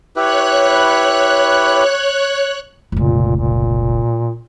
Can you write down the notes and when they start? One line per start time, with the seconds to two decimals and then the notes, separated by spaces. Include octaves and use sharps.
0.16 E4 G4 B4 C#5 F#6
2.92 F1 C#2 A#2
3.36 A#2